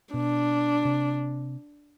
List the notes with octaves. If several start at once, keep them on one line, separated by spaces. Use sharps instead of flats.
B2 D4
C3